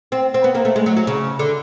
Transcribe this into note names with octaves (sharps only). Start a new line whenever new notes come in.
C4
C4
B3
A#3
A3
G#3
F#3
F#3
C#3
D3